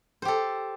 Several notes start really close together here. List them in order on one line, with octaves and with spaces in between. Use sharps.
C5 G4 A4